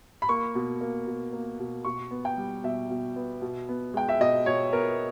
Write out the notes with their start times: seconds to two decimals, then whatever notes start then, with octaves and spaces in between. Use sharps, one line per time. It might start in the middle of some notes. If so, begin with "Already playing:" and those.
0.22 B5
0.29 A#3 C#6
0.55 B2
0.81 A#3
1.07 B2
1.33 A#3
1.60 B2
1.85 B2 C#6
2.11 B3
2.25 G5
2.37 G3
2.64 B2 E5
2.90 B2
3.16 B3
3.42 B2
3.69 B3
3.94 G#3 G5
4.09 E5
4.20 B2 D#5
4.46 B2 C#5
4.72 B3 A#4